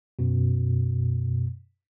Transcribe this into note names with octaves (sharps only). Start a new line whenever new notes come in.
F#2 B2